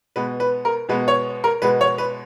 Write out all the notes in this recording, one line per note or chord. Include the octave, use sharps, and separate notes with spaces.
B2 G#3 B3 B4
B4
A#4
B2 G#3 B3 B4
C#5
A#4
B2 G#3 B3 B4
C#5
B4